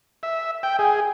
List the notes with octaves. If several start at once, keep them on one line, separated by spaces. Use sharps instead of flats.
E5
G5
G#4